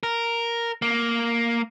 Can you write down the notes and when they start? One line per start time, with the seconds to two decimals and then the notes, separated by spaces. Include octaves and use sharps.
0.03 A#4
0.82 A#3